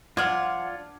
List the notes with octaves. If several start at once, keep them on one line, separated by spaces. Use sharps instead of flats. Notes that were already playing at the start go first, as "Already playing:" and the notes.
F3 D4 F4 D5 F#5 F6 G#6